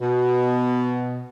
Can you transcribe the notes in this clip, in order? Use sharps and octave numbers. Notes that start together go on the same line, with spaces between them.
B2